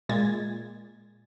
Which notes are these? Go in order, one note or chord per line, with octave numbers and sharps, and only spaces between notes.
A#2 G#3 G#6 A6